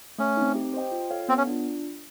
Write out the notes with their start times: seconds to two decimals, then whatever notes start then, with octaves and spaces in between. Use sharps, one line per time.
0.18 A3 C#4
0.37 C4 D#4
0.55 G4
0.74 C5 D#5 G5
0.92 F4
1.11 A4 C#5 F5
1.28 B3 C4
1.38 C#4
1.47 D4 F4